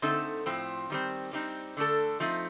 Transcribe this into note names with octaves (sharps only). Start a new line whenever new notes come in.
D3 A3 C4 D#4 A4
A2 F3 C4
D#3 G3 C4
G3 C4 D#4
D3 A3 D4 A4
F3 A3 C4 D#4